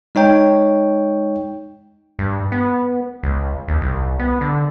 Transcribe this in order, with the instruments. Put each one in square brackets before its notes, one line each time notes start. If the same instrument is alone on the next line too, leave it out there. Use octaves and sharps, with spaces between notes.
[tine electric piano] G#3 D#4 C#5 G5
[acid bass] G2
B3
C#2
D#2
C2
B3
D3